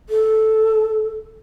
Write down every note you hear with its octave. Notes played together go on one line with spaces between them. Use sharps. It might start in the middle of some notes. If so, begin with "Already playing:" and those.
A4